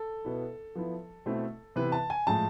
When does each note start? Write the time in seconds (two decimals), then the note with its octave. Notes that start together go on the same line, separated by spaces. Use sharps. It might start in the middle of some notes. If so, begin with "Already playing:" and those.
Already playing: A4
0.25 B2 B3 E4
0.75 F3 B3 E4
1.26 B2 A3 C4 E4
1.76 C3 E3 B3 E4 B4
1.92 A5
2.10 G#5
2.27 A2 F3 G#3 A5